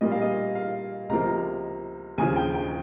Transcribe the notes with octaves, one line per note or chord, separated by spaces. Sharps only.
A#2 G3 A#3 D#5
F5
D#5
F5
C#2 C3 F3 A#3 A#5
D#2 C#3 F3 G#5
G5
G5